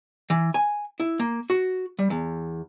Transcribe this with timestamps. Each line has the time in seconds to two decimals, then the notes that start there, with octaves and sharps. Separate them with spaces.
0.30 E3
0.54 G#5
1.00 E4
1.20 A#3
1.50 F#4
1.99 G3
2.10 E2